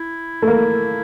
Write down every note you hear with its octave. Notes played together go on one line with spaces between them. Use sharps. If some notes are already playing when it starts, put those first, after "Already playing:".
Already playing: E4
A3
A#3